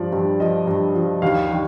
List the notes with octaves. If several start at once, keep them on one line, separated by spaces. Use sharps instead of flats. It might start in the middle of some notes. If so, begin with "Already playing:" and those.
Already playing: G2 F3 D5
G2
F3 D#5
G2
F3
D#2 F5
D#3